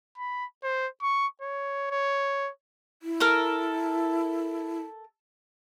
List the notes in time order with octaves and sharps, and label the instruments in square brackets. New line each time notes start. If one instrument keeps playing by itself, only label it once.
[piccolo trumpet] B5
C5
C#6
C#5
C#5
[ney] E4
[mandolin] A4 A#4 F6